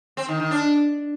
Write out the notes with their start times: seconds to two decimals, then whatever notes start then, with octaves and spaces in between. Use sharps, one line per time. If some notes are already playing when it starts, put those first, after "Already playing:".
0.17 C4
0.28 D#3
0.40 D#3
0.51 D4